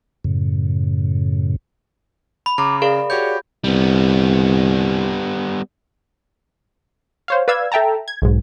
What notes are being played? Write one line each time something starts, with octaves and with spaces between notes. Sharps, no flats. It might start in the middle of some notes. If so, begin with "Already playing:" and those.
F#2 A2 C#3
B5
C#3 A#5 D6
G#4 A#4 D5 F5
F#4 G4 C#5 G6
C2 G3 B3
C5 C#5 F5
B4 D5 F5 E6 G#6
A4 E5 G5 A5 A#5
G#6
B1 G#2